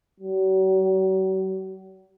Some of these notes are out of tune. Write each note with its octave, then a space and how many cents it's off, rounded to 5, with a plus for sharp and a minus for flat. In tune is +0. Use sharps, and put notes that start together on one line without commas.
F#3 +40